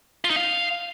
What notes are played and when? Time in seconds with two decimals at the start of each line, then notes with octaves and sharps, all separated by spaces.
0.25 F4
0.30 D#4
0.36 F5